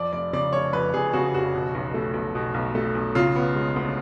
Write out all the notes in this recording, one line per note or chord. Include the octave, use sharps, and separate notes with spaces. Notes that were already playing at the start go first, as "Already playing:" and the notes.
Already playing: F2 D5
F1 D5
C#3 D5
F1 C#5
F2 B4
F1 G#4
C#3 F#4
F1 F#4
B2
B1
A3
B1
B2
B1
A3
B1
C#3 F4
B3
G#3
D2